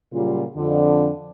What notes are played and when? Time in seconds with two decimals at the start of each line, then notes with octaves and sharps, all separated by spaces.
0.13 A#2 C#3 F#3 G3 F4
0.56 F2 D3